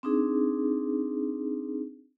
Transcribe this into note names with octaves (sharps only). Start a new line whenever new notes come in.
C4 D4 D#4 G#4